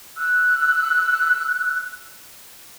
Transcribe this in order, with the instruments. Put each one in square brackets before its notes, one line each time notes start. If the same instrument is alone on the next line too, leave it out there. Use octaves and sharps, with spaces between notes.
[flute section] E6 F#6